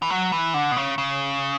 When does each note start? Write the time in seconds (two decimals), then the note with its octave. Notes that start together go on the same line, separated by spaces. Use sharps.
0.02 E3
0.10 F#3
0.32 E3
0.54 D3
0.71 B2
0.77 C#3
0.98 C#3